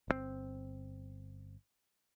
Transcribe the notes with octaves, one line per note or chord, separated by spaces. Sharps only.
G1 D3 C4